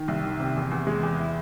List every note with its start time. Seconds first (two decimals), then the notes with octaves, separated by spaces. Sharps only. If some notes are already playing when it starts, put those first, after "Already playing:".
Already playing: D#3
0.08 C2
0.24 D#3
0.40 C3
0.56 E2
0.71 E2
0.87 G#3
1.03 E2
1.19 E4